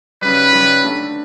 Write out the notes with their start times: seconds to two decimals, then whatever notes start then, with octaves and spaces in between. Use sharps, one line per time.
0.22 F#2 C#3 G3 B4
0.52 F#2 C#3 G3
0.83 D3 A3 D4